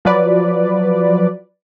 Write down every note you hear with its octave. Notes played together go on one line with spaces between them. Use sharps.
F3 F#3 B4 D5